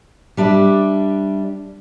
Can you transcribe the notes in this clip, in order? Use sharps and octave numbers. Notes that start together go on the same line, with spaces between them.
G3 D4 E5